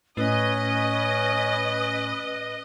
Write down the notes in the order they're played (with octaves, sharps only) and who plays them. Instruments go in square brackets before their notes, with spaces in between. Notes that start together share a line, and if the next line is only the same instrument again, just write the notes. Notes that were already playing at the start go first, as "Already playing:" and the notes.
[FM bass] A2 [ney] C#4 [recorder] B4 [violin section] D#5